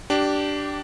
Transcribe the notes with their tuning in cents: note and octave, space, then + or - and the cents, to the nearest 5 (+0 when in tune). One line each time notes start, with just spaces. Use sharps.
D4 +0 G4 -20